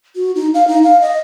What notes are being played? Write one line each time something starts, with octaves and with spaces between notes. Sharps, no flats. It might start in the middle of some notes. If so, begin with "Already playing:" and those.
F#4
D#4
F5
D#4
F5
D#5